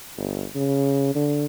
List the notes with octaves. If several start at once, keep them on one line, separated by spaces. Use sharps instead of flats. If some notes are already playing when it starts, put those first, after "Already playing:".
G1
C#3
D3